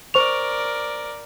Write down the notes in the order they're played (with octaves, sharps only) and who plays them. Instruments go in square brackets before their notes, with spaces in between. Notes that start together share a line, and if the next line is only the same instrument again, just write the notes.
[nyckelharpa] A#4 D5 [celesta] C5 C#6 F7